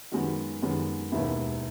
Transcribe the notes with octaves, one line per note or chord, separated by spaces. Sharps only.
F#2 D#3 G#3 B3 F#4
F#2 D#3 G#3 B3
E1 D#2 D#3 G#3 B3 E4